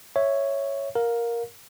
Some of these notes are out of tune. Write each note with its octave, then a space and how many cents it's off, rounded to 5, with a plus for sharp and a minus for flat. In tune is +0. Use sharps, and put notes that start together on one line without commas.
C#5 +0 E5 +0
A#4 +5 F5 +25